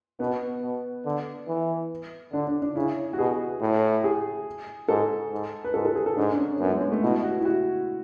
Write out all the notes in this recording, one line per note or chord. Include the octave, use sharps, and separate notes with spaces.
B2 B3
B2
D3
E3
D3 D4
D4
D4
C#3 E4
F#4
B2 G#4
A2
G#4
G#2 A4
G#2
B4
G#2 A4
A4
G#4
A4
G#2 D4
D4
C#4
F#2 B3
G#3
G#3
A3
B2 E4
F#4
E4
F#4